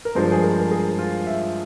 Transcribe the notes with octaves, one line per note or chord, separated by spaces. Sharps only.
A#4
G2 F3 G#3 C5
G#4
A#4
A#4
G#4
F4
E5